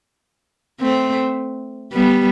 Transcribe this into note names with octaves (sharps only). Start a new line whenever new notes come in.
A3 C4
G3 B3